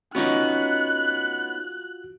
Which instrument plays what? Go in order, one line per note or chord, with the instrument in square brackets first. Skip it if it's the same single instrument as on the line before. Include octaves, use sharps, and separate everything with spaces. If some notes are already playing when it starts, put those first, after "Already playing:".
[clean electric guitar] B3 C#4 D#4 [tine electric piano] F4 F#4 [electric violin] F#6